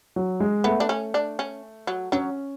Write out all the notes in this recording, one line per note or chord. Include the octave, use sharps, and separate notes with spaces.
F#3
G#3
A3 B3
D4
C#4
D4
C#4
F#3
F#3 C#4